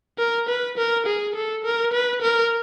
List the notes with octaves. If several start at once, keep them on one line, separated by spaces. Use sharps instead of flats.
A#4
B4
A#4
G#4
A4
A#4
B4
A#4